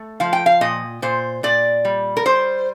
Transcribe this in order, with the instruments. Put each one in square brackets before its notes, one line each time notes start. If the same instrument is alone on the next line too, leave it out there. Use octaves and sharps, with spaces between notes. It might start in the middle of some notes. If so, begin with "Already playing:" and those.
Already playing: [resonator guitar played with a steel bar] A3
F3 F5
G5
F5
A#2 D#5
A#2 C5
A#2 D5
G3
A#4
G3 C5